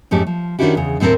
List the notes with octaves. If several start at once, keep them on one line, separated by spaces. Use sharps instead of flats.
F2 G#2 A3 C#4 G4
F3
D#3 C#4 D4 E4 F#4 G4
E2 C#3
D#2 A2 C4 A4 A#4